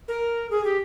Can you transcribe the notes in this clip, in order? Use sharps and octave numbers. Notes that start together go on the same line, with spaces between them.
A#4
G#4
G4